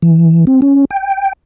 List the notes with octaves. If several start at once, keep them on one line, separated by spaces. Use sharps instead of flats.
E3
C4
C#4
G5